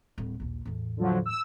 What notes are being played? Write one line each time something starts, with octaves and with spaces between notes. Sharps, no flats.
D1 G3
A#1 D#2
E2 A2
D3 F3 F#3
E6